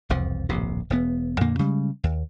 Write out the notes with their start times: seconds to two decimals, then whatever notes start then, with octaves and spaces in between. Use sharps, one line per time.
0.09 E1 C2 F2 F3
0.49 D1 A#1 F2 C3
0.90 E1 A#2 B3
1.41 F2 A#2 D3 A#3
1.59 C#3 G3 G#3
2.04 D#2